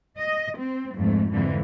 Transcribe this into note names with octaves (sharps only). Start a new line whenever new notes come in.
D#5
C4
F2 G#2 A3
F2 G#2 D3 E3